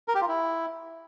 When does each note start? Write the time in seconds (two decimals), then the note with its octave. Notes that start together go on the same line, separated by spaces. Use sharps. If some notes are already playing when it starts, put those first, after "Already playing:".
0.08 A#4
0.15 G4
0.21 F4
0.28 E4